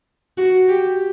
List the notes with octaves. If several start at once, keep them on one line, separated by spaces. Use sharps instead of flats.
F#4
G4